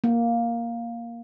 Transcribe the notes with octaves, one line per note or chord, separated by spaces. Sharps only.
A#3